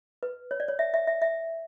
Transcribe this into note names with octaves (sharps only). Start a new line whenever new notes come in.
B4
C#5
D5
C#5
E5
E5
E5
E5